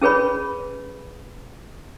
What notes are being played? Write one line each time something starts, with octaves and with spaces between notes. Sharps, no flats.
C#4 G#4 B4 C#5 B5